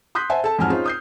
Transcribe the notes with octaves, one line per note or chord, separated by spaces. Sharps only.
C6 D#6 F#6 G6 B6
C5 E5 F#5 G#5 A5
A4 A5
F2 G#2 F#3 G#5 A5 F6
C#4 D#4 F4 G#4 C5
D#6 G6 C7